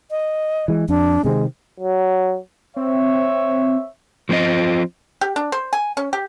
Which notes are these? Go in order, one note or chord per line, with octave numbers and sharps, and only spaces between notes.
D#5
E3 G#3
F2 D4
C3 D#3 G#3 C4
F#3
C4 C#5 E5
F3 A#3 C4 F4 D#5
G4
D4
C5
G#5
C#4
G4